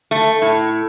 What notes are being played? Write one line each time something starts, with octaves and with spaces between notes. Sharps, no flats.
A3
A2